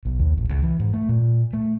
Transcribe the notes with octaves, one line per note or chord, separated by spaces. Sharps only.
B1
D#2
A1
C#2
E3
G#2
A3
A#2
A3